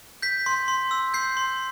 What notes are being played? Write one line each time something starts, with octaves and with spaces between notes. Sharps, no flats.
G6 B6
C6
C6
E6
G6 C7
C6